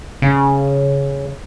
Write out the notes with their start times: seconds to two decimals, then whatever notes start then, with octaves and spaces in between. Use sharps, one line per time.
0.22 C#3